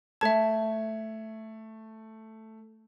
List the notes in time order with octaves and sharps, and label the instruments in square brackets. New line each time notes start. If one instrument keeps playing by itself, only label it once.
[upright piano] A3 G#6 [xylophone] E5 A5